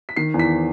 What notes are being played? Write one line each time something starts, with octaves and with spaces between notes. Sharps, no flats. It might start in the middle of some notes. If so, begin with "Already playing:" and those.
B6
D#3 C7
E2
B6